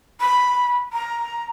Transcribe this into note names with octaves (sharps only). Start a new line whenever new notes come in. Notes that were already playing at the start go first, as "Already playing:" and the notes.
B5
A#5